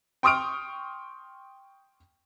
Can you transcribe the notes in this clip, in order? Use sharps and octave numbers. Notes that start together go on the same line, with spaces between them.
G5 C6 C#6 D#6 F6 D7